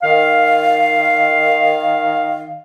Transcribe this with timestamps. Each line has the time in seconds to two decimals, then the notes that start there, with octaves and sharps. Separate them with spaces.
0.03 D#3 F5